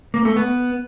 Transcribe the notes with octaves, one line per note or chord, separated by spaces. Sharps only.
A#3
A3
B3